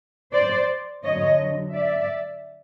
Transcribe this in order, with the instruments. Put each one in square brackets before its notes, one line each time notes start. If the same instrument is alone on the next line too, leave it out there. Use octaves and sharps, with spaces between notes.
[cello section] C5 D5
F2 D3 F#3 C#5 D#5
D5 E5